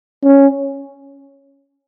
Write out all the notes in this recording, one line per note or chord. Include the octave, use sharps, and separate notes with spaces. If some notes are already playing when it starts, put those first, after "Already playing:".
C#4